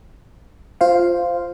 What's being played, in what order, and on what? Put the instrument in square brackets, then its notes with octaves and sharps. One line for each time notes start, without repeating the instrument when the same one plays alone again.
[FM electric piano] F4 C5 F5